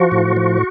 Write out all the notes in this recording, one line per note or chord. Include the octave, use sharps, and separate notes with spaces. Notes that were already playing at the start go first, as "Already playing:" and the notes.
Already playing: F3 F#4
A2
F3